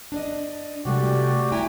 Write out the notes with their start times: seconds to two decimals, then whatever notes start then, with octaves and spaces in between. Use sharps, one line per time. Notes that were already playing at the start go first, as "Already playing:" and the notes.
0.12 D4 D5 D#5
0.85 C3 G3 A3 F#4 G4 D5
1.52 E4 G5 G#5 A#5